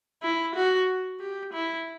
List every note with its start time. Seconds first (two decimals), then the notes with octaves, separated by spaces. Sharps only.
0.23 E4
0.55 F#4
1.20 G4
1.53 E4